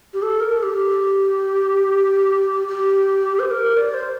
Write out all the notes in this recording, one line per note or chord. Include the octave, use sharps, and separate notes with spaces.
G4
A4
A#4
A4
G4
G4
C5
A#4
D5
C5